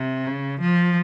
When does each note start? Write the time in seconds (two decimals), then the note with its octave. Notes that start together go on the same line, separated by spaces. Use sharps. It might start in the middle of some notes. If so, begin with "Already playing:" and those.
Already playing: C3
0.27 C#3
0.60 F3